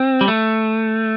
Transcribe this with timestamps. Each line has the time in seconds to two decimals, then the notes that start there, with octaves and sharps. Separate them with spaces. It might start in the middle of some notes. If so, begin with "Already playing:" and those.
Already playing: C4
0.21 G3
0.28 A3